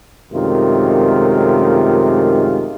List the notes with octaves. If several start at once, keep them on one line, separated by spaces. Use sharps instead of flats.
F#2 C3 D#3 G#3 A3 F4